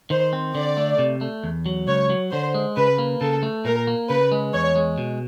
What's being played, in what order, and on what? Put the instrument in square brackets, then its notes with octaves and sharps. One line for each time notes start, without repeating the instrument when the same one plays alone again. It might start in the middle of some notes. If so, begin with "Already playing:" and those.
[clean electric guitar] D#3 [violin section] C5
[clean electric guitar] C4
[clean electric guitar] D3 [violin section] D5
[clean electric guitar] A3
C3
A3
E2
F#3
[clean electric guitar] C#2 [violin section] C#5
[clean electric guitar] F#3
[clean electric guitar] D3 [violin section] C5
[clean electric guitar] G#3
[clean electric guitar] C#3 [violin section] B4
[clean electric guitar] A#3
[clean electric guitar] C#3 [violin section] A4
[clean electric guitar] A3
[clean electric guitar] A#2 [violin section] A#4
[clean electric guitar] A#3
[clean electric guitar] C#3 [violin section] B4
[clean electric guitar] G#3
[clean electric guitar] E2 [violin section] C#5
[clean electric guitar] G#3
B2